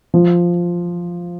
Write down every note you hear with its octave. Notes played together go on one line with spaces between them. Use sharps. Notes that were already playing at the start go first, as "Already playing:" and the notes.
F3